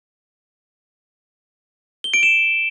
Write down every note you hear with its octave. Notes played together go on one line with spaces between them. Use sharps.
G7
D7
E7